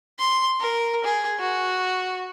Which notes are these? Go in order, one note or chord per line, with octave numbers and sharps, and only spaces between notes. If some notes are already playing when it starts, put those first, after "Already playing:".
C6
A#4
G#4
F#4